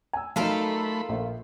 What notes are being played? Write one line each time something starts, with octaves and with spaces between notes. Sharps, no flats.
G#5 E6
F#3 A3 D#4 F4 A4 A#4 B5
A#1